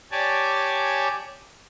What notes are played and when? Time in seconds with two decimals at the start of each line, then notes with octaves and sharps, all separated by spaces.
0.11 G4 C#5 D5 G#5 A5 D6